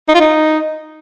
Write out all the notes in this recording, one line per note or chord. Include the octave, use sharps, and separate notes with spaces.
D#4
F4
D#4